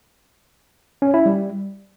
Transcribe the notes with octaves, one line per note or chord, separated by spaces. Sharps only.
C#4
E4
G3